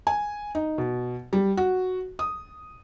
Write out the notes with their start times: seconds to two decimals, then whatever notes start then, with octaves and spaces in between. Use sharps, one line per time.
0.07 G#5
0.55 D#4
0.78 B2
1.33 G3
1.57 F#4
2.19 D#6